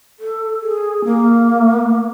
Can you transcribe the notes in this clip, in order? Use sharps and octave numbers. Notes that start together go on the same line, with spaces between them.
A4
G#4
A#3